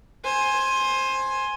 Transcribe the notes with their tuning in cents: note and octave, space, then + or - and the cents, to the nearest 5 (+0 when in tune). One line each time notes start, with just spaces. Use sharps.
C5 +15 G#5 +5